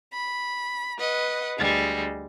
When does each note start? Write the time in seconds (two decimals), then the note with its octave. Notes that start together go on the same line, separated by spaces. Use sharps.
0.14 B5
0.98 B4 D#5 F#5
1.58 D2 G3 G#3